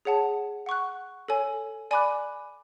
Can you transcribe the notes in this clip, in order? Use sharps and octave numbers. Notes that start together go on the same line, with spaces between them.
G#4 C#5 F#5 A5
F#5 C#6 F#6
A4 C#5 G#5
D5 G#5 B5 D6 F#6